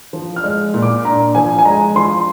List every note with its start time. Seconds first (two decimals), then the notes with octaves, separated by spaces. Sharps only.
0.13 F3
0.36 F6
0.43 G#3
0.74 A#2
0.82 D6
1.05 D4 A#5
1.35 F3 G#5
1.59 G#5
1.65 G#3 A#5
1.96 F3 C6